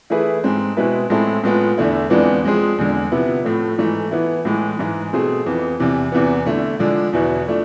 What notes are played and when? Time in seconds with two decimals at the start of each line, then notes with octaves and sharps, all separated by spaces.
0.10 E3 A3 E4 G#4 B4
0.44 G#2 G#3 C4
0.77 B2 G#3 C4 E4 B4
1.10 A2 G#3 C4 E4 A4
1.44 A2 G#3 B3 F4
1.78 E2 D3 A3 E4
2.10 F2 E3 G#3 B3 D4
2.44 F3 G#3 C4 G#4
2.78 E2 D3 G#3
3.12 C3 F3 B3 E4
3.45 A2 F3 A3
3.78 G#2 E3 A3
4.11 E3 B3 E4
4.45 A2 E3 G#3
4.79 G#2 E3 G#3
5.13 B2 A3 C4 G#4
5.46 F2 E3 B3
5.80 E2 C3 E3
6.12 E2 C3 E3 B3
6.46 D3 A3 E4
6.79 D3 F3 G#3 D4
7.13 E2 B2 B3 E4
7.47 F3 A3 D4